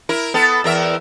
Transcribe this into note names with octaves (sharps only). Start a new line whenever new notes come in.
E4 A#4
B3 A4
E2 A#4 E5